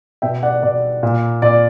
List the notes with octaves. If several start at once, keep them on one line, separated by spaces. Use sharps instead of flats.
B2 E5 G5
D5 F#5
B2 D5
A#2
A#2 D5